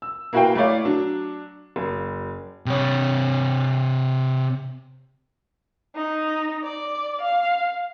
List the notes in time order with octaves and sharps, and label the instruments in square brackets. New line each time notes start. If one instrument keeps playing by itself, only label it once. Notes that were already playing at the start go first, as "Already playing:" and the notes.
[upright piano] E6
A#3 E4 F#4 B4 F5 G5
A3 E4 C#5 D5 F5
F#3 D4
F#1
[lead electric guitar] C3 C#5
[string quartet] D#4
D5
F5